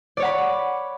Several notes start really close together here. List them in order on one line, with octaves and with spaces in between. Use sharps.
D5 C#5 F#5 B5